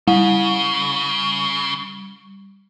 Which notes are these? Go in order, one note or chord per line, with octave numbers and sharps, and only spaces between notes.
C#3 G3